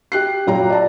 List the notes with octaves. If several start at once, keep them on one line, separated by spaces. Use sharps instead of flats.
G4 F#6 C7
F#1 A#2 F#3 G4 A#5
D5 A5 A#5